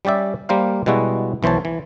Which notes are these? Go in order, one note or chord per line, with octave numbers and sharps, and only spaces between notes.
G3 C#4 G4 D5 E5
G3 A#3 A#4 C5 F5
B2 G3 G#3 E4 F#4
B1 E3 C5 C#5 A5
E3